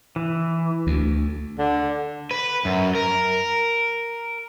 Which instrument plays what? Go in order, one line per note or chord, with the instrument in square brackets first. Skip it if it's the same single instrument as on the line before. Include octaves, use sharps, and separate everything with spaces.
[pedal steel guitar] E3
[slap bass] D2
[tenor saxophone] D3
[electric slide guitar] B4
F#2
A#4